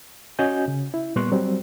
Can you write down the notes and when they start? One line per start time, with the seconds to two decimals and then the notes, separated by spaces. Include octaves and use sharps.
0.39 C#4 F#4 D#5 G#5 G6
0.68 C#3
0.94 E4
1.16 A#2 G3 B3 C6 C#6 F#6
1.32 F#3 G3 C4